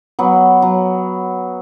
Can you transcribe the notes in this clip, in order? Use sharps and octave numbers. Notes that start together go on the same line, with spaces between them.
F#3 B3
F#3